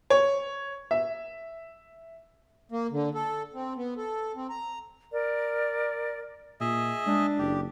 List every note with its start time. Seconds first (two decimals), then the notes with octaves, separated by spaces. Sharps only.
0.10 C#5
0.91 E5
2.72 A#3
2.91 D3
3.14 A4
3.54 C4
3.76 B3
3.97 A4
4.35 C4
4.50 A#5
5.12 A#4 D5
6.61 A#2 G#4 D#5 E5
7.07 G#3 D4
7.39 F#1 G4